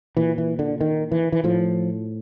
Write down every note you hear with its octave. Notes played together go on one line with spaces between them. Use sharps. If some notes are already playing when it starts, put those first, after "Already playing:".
A#2 E3
E3
D3
D#3
E3
E3
A2 F3